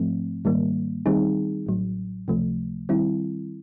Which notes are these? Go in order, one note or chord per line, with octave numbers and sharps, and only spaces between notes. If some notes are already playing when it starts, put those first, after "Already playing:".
Already playing: G#2 F3 A3 C4
G#2 D#3 G3 A#3
D#3 G3 C4 D#4 G#4
A1 A2 F#3
C#2 C3 F3 A3
D#3 G3 C4 E4